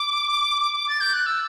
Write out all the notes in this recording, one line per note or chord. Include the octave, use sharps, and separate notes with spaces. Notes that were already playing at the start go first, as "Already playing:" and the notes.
Already playing: D6
A6
G6
F#6
E6